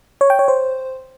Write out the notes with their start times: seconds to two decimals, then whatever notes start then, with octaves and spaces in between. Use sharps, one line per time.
0.21 C#5
0.30 G5
0.39 C#5
0.48 C5